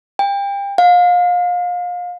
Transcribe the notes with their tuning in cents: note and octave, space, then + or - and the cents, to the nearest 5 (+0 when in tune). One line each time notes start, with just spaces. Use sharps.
G5 +30
F5 +30